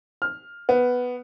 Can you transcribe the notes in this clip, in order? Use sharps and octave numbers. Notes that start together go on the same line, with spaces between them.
F6
B3